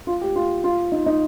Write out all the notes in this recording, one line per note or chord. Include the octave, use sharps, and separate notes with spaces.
F4
G4
F4
F4
D#4
D#4